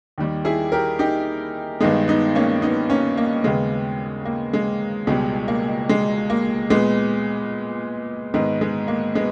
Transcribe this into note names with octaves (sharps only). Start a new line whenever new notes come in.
D#2 D#3 G3
E4 G#4
G4 A#4
D#4 G4
G2 D#3 G#3 B3 D#4
B3 D#4
A#3 C#4
B3 D#4
A#3 C#4
A#3
D#2 C#3 G#3 B3
A#3
G#3
C#2 B2 G3 G#3
A#3
G#3
A#3
A#2 G#3 B3
G#2 D#3 G#3 B3
G#3
A#3
G#3 B3